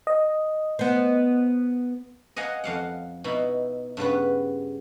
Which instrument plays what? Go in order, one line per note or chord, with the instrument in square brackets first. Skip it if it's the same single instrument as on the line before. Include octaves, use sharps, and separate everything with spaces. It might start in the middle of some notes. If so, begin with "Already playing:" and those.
[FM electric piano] D#5
[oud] B3 C5
[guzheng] D#5 F5 F#5 G#5 A#5
F2 F5 F#5
B2 D#4 E4
G2 C#3 B3 B4